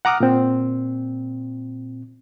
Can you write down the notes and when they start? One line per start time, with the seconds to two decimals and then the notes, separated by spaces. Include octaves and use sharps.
0.05 F#5 A#5 D6 D#6 F6
0.20 A#2 C4